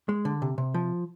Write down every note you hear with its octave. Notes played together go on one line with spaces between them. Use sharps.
G#3
D3
C3
C3
F3